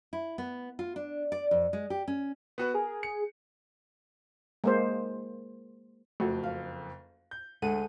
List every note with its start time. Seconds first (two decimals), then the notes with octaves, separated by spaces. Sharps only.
0.13 E4
0.38 B3
0.79 F4
0.96 D4
1.32 D5
1.51 F2
1.73 G#3
1.90 G4
2.08 C#4
2.58 B3 F#4 B4
2.74 G#4 A#4
3.03 C#7
4.64 G#3 A#3 C5
6.20 F#1 F2 A3 F#4 A4
6.43 F5
7.31 G6
7.62 D2 G#3 A4 F#5 D#7